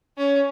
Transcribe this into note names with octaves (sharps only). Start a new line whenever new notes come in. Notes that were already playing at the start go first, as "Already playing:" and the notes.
C#4